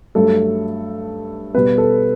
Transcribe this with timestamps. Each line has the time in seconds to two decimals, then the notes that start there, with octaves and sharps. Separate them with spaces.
0.15 G2 F#3 A3 A4
1.54 B2 G3 B3 B4
1.78 A4